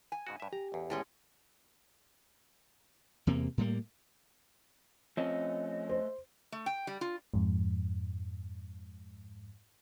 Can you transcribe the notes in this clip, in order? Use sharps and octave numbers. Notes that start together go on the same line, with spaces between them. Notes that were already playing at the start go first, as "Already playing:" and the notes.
G#5
G#2 C#3 F#4
G2 E5
G4 A#5
A1 E2
A2 G#3 C#4
E2 C3 A#3
A2 G3 A#3
F3 A3 C4 C#4 D#5
C5
A3
G5
G3
F4
F2 G#2